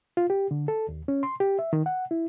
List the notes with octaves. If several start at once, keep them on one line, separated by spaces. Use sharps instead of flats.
F4
G4
D3
A4
D#2
C#4
C6
G4
E5
D#3
F#5
E4